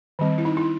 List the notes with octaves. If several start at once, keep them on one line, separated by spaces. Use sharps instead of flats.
D#3 G3 C4
E4
D#4
E4